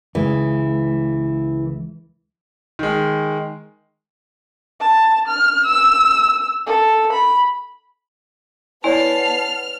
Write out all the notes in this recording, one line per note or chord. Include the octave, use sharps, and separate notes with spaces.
C#2 E3 G#3
D#3 G#3
A5
F6
E6
A4
B5
B3 E4 C#5 D5 G#5 A5 F6 C7